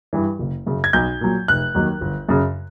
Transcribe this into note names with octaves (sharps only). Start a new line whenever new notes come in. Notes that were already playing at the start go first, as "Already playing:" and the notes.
G2 E3
F#1
F#2 C#3
G#6
B1 G6
A#2 F#3
F1 F#6
D#2 D#3 F#3
G1
F#2 C#3